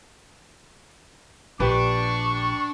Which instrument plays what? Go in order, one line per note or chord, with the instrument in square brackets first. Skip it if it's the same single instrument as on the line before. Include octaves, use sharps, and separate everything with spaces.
[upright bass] A#1 [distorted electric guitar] D4 [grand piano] G4 B4 [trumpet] C#6